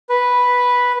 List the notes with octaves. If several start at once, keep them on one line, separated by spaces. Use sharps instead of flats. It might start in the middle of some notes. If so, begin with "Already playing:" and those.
B4